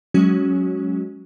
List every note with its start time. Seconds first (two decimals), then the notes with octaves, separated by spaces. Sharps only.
0.14 F#3 G#3 C#4 F#4